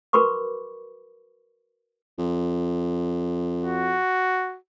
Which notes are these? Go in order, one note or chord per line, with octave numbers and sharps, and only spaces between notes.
F#4 A#4 B4 B5 C#6 D6
F2
F#4